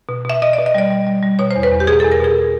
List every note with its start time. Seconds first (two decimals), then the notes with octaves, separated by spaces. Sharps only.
0.09 B2
0.25 B2 E5
0.42 B2 D#5
0.53 B2 D5
0.66 D#5
0.75 G3 D5
0.90 G3
1.07 G3
1.23 G3
1.39 B2 C#5
1.51 E2 C5
1.63 B4
1.72 E2
1.80 G4
1.87 B2 G#4
2.00 E2 A4
2.12 A#4
2.20 B2 G#4